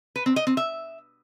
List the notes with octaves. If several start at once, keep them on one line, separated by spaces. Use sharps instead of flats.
B4
C4
D#5
C4
E5